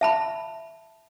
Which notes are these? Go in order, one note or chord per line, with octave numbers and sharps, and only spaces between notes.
E5 A5 B5